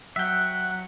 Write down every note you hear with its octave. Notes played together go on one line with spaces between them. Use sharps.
F#3 E5 F#5 G5 F#6